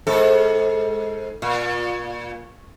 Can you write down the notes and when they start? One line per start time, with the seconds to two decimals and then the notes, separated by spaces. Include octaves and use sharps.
0.07 G#2 A4
1.42 A#2